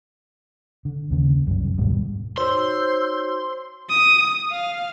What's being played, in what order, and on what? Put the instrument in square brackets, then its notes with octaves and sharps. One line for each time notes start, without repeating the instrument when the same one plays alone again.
[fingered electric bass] D3
D#2 C#3
G1 C2 F#2
D#2 G#2 B2 G3
[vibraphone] D#4 F#4 C#5 [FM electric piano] C5 [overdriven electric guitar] C6 [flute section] E6 G6
[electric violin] D#6
F5